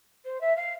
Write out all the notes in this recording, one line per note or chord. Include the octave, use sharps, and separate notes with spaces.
C5
E5
F5